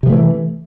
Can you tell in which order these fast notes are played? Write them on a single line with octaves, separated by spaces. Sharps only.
C3 F3 A3 E3